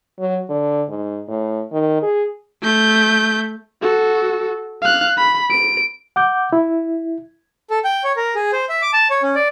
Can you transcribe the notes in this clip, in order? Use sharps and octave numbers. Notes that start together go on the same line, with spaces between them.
F#3
D3
G#2
A2
D#3
G#4
A3 G6
F#4 A4
F5 F#6
B5
D7
F#5 D6 G6
E4
A4
G5
C#5
A#4
G#4
C5
E5
D6
A5
C#5
C#4
D5